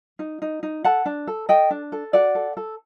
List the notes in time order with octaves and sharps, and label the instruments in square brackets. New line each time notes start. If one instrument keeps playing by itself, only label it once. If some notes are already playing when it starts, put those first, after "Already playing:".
[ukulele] D#4
D#4
D#4
A4 F#5 A5
D4
A4
A4 D#5 G5
D4
A4
F#4 D5 F#5
A4
A4